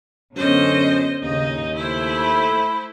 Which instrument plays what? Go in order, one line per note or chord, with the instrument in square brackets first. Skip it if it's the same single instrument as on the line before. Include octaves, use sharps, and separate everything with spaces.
[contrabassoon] F#2 [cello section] D3 B3 C#4 [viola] C5 D#5
[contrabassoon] D#2 [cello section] C#3 D#5 [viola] D#4
[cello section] A3 [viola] E4 C5
[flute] B5